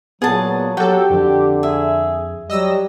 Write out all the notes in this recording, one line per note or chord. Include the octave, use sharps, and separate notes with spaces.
A#2 F#3 B3 G#4 A5 D#6
F#3 F#4 G4 A4 G5
F2 D3
G#4 E5
F#3 G3 D#5 E6 A#6